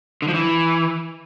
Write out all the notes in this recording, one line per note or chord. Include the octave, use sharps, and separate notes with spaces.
D3
F3
E3